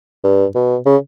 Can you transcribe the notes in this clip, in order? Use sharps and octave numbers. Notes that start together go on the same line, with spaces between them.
G2
B2
C#3